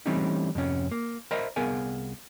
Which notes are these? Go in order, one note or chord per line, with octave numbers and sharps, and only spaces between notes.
E3 G3 A3 C4 C#4 D#4
F2 C3 C#4
A#3
A#4 C5 D#5 E5 A#5 B5
C2 B3 G#4 A#4 F5 G#5